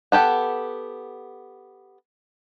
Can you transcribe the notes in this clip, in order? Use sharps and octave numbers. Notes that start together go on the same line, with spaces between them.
B3 G4 A4 F#5